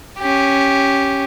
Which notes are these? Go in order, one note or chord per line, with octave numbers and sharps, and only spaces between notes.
C#4 G4